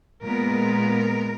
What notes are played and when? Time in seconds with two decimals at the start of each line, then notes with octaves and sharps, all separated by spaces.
0.23 A#2 G#3 B3 A#4